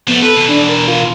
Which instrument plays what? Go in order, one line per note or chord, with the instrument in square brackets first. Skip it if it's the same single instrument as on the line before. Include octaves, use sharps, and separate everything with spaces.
[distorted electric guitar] F3 A3 [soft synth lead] B3
[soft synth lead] A4 [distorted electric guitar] B4
[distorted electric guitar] B2 E3
[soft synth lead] D4
A#4
F4